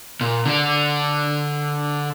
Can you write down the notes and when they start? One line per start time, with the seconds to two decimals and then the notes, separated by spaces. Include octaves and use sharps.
0.21 A#2
0.45 D3 D4